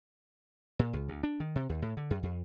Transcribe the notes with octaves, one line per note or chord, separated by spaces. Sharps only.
A#2
C#2
D2
D4
D#3
C3
D#2
A2
D3
F#2
F2